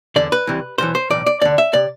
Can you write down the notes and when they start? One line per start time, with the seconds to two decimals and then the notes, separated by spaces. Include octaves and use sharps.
0.16 E2 D3 D5
0.32 B4
0.47 C2 C3 E3
0.78 B1 A2 E3 C5
0.95 C5
1.10 B1 A2 E3 D5
1.26 D5
1.41 D2 D3 D5
1.58 E5
1.73 C3 D5